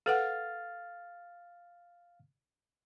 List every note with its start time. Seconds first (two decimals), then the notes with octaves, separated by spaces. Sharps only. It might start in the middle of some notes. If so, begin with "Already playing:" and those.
0.06 A4 B4 F5 F#5 F6 A6